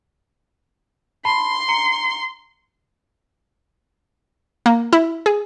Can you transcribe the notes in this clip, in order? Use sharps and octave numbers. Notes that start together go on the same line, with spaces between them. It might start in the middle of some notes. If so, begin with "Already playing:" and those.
A5 B5 C6 C7
A#5 C#7
A#3
E4
G#4